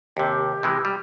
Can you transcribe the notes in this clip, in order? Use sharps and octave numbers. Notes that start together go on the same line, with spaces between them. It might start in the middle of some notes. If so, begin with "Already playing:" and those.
D#2 C3 G4
C3 E3 G#3
G3